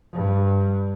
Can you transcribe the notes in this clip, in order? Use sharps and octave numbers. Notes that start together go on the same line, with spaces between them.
G2